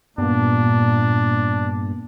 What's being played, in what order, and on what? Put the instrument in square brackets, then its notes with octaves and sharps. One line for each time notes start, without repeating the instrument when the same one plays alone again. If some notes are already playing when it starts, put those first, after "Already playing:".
[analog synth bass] G2 [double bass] A#2 [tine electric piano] A#3 B3 [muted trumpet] D4